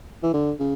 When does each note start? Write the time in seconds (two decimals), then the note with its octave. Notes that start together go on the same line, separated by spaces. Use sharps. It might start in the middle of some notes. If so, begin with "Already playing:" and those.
0.23 E3
0.34 D3
0.60 C#3